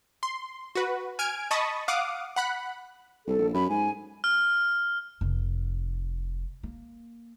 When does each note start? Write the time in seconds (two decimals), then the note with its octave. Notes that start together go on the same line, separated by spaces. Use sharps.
0.23 C6
0.75 F#4 B4
1.19 G#5 F6 G#6 D7
1.51 D#5 A5 B5 C#6 D#6
1.88 F5 F#5 D6 D#6
2.36 F#5 B5 F#6
3.27 C2 A4
3.38 A#1
3.54 F#2 B5
3.69 G#2 G#5
4.24 F6
5.21 F1
6.63 A#3